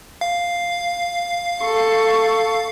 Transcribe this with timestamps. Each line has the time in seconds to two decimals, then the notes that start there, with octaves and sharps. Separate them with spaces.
0.21 F5
1.61 A4 C#6